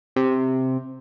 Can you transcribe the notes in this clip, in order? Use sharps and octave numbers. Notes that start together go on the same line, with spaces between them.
C3